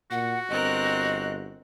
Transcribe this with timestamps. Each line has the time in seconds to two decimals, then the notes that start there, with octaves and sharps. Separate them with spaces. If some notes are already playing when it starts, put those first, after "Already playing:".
0.11 A#2 F#4 F#5
0.49 G1 C4 A#4 D#5 F#6